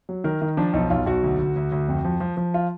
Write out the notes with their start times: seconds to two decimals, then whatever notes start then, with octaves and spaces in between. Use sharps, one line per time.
0.09 F#3
0.24 D#3 A#4
0.42 D#3
0.57 F3 D4
0.73 B1 D#4
0.90 B1 F4
1.06 B1 F#4
1.23 D2
1.39 D2
1.56 D2
1.72 D2
1.88 F2
2.05 F3
2.20 F3
2.37 F3
2.54 F4